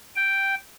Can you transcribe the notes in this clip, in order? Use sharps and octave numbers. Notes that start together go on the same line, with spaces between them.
G5